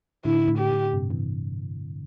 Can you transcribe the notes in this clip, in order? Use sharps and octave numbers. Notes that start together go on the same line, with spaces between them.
A2 D3 E4
A2 D3
G4
A2
G2 C3
C3 E3